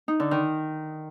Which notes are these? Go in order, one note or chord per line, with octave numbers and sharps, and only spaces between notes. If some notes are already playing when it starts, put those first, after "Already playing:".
D#4
D3
D#3